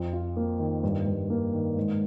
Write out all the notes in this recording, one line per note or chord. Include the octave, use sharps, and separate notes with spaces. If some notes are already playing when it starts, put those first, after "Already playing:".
Already playing: F2
F4
A#3
D#3
G2
G2
A#3
D#3
G#2